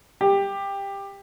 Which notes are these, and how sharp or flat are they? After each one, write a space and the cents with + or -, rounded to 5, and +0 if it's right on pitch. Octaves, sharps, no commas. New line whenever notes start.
G4 +15